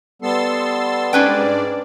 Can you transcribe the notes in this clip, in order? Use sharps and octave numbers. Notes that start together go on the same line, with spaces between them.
G3 B3 A4 C6 E6 A6
G#2 C#4 D4 B4 D5 G5